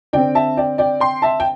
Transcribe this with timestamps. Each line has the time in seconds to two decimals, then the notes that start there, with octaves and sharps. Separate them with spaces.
0.13 D3 C4 D5 G5
0.35 E5 A5
0.57 D5 G5
0.78 D5 G5
1.00 G5 C6
1.22 E5 A5
1.40 G5